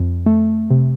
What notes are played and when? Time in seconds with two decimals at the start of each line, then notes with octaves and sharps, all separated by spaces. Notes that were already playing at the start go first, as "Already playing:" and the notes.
Already playing: F2
0.26 A3
0.71 C3